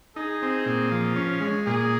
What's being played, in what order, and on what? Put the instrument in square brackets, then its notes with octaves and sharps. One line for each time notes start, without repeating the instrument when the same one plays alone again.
[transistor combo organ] D#4 [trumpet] G#4
[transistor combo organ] C4
A#2
F3
C#4
G#3
[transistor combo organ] A#2 [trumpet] G#4